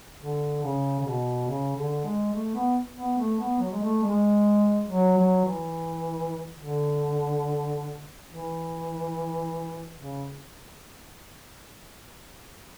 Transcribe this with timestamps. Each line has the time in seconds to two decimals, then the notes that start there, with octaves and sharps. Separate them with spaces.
0.21 D3
0.62 C#3
1.00 C#3
1.06 B2
1.48 C#3
1.76 D3
2.04 G#3
2.33 A3
2.55 B3
2.97 B3
3.18 A3
3.39 B3
3.60 F#3
3.71 G#3
3.82 A3
4.03 G#3
4.89 F#3
5.18 F#3
5.46 E3
6.58 D3
8.29 E3
9.99 C#3